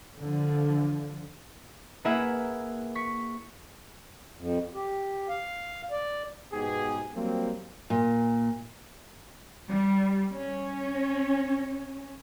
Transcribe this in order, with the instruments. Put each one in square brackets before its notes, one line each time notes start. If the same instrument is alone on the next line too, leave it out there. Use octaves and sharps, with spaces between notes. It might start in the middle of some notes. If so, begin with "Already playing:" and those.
[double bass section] D3 F3
[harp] A#3 E4 G#4 B4 E5 F#5
C#6 B6
[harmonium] F2
G4
F5
D5
[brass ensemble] G#2 B2 B3 G4 G#4
F#3 G3 A#3 C4
[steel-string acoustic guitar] A#2
[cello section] G3
C#4